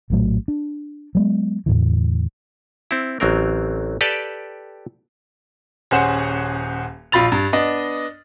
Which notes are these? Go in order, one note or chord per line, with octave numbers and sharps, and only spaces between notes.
A#1 A2 F#3 A3
D4
F#3 G#3 B3
E2 A2 D3 E3
C4 E4
A1 F#3 C4 A#4
G4 A4 B4 D5 G5 A5
D#1 C#4 G#4 C5 F#5 E7
A#1 F4 B5 A6 F7
G2
B3 D4 D#5